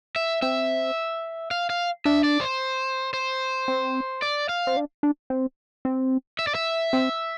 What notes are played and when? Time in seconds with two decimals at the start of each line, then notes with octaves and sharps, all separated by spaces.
0.16 E5
0.42 C4 E5
1.51 F5
1.70 F5
2.05 D4 E5
2.24 D5
2.41 C5
3.14 C5
3.68 C4
4.22 D5
4.49 F5
4.67 C4
4.77 D4
5.03 D4
5.30 C4
5.85 C4
6.39 E5
6.47 D5
6.55 E5
6.93 C4